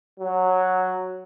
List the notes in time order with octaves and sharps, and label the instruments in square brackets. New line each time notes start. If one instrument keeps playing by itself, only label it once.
[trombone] F#3